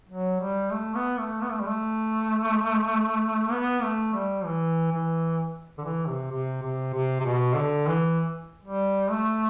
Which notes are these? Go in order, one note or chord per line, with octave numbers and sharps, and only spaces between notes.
F#3
G3
A3
B3
A3
B3
A3
G3
A3
B3
A3
G3
E3
E3
D3
E3
C3
C3
C3
C3
C3
B2
D3
E3
G3
A3